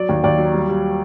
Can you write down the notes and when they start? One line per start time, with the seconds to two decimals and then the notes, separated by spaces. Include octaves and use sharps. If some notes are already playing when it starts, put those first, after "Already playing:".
Already playing: F#3 D5
0.09 D#2
0.24 D#2 D5
0.38 F#3
0.54 G3
0.69 G3